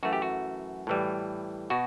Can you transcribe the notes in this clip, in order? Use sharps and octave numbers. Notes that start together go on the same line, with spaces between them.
F#2 E3 A3 F#4
G4
F#4
A2 E3 G3
B2 F#4